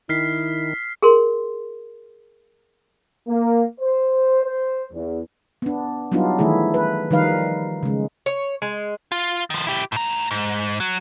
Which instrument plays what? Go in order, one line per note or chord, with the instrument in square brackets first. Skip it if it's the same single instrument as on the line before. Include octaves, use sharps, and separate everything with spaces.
[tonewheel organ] D#3 [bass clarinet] E4 [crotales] F6 B6 C7
[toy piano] G#4 A#4 C6
[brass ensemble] A#3
C5
C5
E2
[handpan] B3 D4
F#3 G3 B3 D4 D#4 F4
D#3 E3 A3 E4 G#4
B4
D#3 F3 G3 D#4 B4 F5
C#3 G#3
[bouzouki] C#5
G#3
[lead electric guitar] F4
D#3 F3
E4 G4
A2 A#5
G#2
F#3